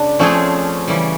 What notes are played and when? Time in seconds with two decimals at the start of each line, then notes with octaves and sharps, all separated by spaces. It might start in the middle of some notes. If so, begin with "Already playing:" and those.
Already playing: C#3 D4
0.19 F3 A3 C4 C#4 F4 G#4
0.88 C#3 E3 G3